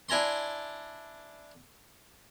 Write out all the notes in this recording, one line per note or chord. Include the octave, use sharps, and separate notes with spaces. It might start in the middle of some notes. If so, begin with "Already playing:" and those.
D4 E4 G#5 A#5 C6